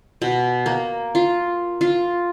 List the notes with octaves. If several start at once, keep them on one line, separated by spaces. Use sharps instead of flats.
B2
A#3
F4
F4